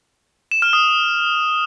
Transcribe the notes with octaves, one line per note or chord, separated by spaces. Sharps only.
E7
F6
D#6